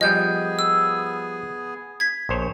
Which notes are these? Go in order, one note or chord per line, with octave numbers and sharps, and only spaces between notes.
F3 G3 B3 G#4 D#5 G#5 G6
E6
G#6 B6
A#1 C5 C#5